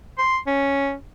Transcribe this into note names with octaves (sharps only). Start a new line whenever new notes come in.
C6
C#4